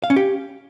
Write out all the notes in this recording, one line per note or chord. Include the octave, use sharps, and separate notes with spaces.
F5
C#4
G4